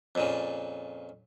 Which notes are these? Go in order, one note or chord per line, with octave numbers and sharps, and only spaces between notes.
F2 A#2 C#3